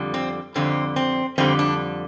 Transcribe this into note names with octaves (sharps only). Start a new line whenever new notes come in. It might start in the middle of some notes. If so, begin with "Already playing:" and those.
Already playing: F2 D3 G3
C4
F2 D3 G3 C4
C4
F2 D3 G3 C4
D4